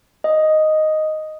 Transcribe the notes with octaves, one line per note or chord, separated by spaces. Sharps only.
D#5